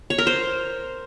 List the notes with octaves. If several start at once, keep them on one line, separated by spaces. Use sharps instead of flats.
C#5
A#4
C5